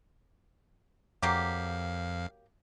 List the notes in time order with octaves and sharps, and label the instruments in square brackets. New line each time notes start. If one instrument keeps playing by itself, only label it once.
[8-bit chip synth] F2 F5 [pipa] F#3 A#3 G4